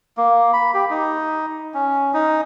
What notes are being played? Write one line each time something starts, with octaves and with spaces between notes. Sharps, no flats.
A#3
B5
G4
D#4
C#4
D#4